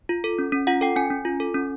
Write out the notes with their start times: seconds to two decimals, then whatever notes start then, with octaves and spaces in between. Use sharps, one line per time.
0.09 F4
0.24 A4
0.39 C#4
0.52 C#4
0.67 F4 F#5
0.81 A4 G5
0.96 C#4 G#5
1.10 C#4
1.25 F4
1.40 A4
1.55 C#4